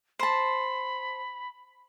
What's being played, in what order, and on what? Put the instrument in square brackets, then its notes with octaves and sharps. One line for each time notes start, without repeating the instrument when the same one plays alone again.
[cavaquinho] C5 A5 [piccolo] B5